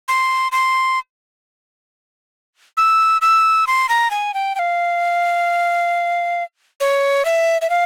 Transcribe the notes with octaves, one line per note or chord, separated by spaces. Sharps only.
C6
C6
E6
E6
C6
A#5
G#5
G5
G5
F5
C#5
E5
E5
F5